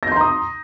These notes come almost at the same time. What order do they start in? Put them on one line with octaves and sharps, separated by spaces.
A#6 G6 C6 A#5 D#6